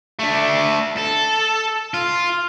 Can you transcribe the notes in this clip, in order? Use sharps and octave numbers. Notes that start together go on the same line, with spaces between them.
A3 D4
A4
F4